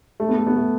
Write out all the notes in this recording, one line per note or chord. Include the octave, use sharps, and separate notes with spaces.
A3
B3
A3
B3
A3